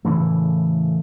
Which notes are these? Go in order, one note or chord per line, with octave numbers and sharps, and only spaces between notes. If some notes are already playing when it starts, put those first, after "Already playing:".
A2 C#3 E3 A3